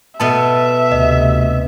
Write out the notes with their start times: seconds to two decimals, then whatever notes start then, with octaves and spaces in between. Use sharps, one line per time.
0.20 B2 B3 A4 E5 A5
0.92 D2 C3 D#5